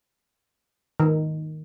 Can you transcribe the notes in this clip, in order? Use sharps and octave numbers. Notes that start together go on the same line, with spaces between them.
D#3